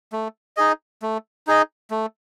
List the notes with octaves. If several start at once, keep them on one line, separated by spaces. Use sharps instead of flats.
A3
D#4 G#4 D#5
A3
D#4 G#4 D#5
A3